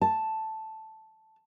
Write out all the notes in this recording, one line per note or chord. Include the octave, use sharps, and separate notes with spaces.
A5